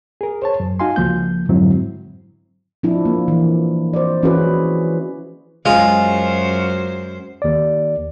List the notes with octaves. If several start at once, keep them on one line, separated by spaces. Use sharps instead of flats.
G#4 A#4
C5 C#5 A5
F#2
D#4 F#4 F5 G#5 C6
C#2 F3 A#3 G6
F2 G#2 D3 F#3 C4 E4
F3 D4 E4
A#3
E3
C5 D5
E3 C#4 E4 F#4 G#4 B4
F#2 G#3 F4 C5
D#2 D5